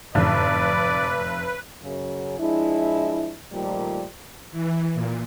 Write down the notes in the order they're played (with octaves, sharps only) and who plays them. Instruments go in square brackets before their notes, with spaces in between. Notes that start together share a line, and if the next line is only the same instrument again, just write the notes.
[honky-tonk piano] F1 [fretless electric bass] F#2 A2 D3 [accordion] B4 [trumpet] D5
[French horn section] F#2 C#3
F3 G#3 D4 E4
A#2 D#3 F3 G3 A3
[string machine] E3
A#2